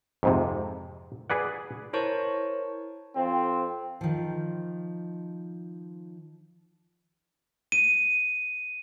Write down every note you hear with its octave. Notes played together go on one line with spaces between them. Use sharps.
F2 G#2 C3
G#4 B4 D5 F#5
E4 A#4 C5 C#5 A5 C#6
F2 C4
D#3 F3
D#7